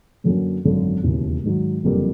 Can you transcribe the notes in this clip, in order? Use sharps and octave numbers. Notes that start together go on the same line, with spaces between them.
F#2 D3 F#3 A#3 C#4
G#1 F#2 D3
E1 D#2 C#3 E3
G#2 D#3 F#3
F#1 F2 D3 G3 A#3